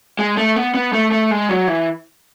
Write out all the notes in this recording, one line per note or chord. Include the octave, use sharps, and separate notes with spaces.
G#3
A3
B3
B3
A3
A3
G#3
F#3
E3